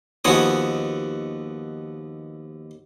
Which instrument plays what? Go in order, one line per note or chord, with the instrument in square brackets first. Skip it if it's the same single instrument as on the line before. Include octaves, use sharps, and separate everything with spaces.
[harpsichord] D#2 F3 B3 F#4 G#5 D#6